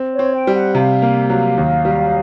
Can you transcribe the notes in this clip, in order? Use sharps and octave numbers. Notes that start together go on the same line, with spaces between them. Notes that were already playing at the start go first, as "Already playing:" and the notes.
Already playing: C4
C#5
C4
G5
G3
F#5
C3 F5
A#3
F#3
D#2
G3